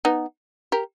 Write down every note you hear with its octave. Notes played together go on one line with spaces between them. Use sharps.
B3 D#4
G4 A#4